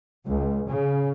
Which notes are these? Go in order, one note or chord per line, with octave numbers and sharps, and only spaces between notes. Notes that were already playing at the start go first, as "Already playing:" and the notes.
C#2
C#3